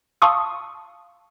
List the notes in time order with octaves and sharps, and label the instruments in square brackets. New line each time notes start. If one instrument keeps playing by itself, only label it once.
[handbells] F5 A5 C6 C#6 D#6 E6